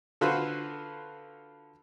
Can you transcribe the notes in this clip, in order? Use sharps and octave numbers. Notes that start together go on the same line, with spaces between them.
D3 F4 F#4 B4 C5